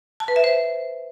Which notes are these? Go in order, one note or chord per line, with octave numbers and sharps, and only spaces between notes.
A5
B4
E5
C5